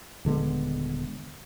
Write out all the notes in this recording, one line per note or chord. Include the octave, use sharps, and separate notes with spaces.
D#1 D3 G#3 B3